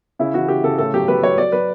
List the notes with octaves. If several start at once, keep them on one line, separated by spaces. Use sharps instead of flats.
C#3 E4
E3 F#4
C#3 G4
C#3 A4
A2 A4
F#3 G4
F#3 B4
F#3 C#5
F#3 D5
F#3 B4